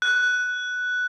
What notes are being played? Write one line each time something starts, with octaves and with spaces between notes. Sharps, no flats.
F#6